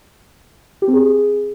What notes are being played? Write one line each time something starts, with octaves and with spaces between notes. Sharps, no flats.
G4
C4
G#4